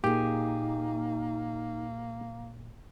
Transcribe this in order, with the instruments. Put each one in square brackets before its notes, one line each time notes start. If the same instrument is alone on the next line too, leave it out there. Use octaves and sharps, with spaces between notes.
[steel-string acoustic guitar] A#2 G#4 [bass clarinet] A#3 [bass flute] D#4 [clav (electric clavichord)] G4